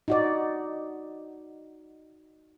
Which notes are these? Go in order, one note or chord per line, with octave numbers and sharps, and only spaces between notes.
D#4 F#4 D5